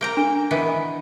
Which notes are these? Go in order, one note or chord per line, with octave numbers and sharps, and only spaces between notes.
A#3 G5 A#5
D4
D#3 E3 B3